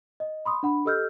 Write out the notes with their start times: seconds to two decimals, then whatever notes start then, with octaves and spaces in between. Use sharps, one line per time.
0.20 D#5
0.45 B5 C6 D#6
0.63 D4 F#5 B5
0.85 G4 A4 D#5 E6 F6 G6